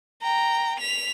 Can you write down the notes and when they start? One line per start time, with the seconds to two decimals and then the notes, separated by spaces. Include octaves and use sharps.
0.22 G5 A#5
0.79 B6 F7